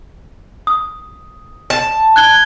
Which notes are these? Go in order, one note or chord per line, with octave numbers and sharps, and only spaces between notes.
D#6
A5
F#6 G#6 G7